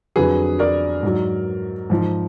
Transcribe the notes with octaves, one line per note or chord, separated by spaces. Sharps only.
F2 D3 F#3 G#4 B4
A#4 D5
G#2 F#3
G#2 F3